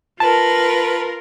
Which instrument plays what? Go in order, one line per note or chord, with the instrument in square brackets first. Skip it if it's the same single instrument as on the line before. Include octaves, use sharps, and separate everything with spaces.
[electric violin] F4 A#4 [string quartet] B4 [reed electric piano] A5